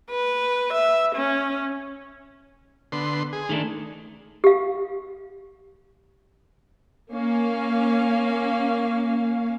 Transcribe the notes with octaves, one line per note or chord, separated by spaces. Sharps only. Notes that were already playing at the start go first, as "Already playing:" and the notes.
B4
E5
C#4
D3 B3 C6
G#4
D#3 A3 D4
G4 F5
A#3 C#4 F5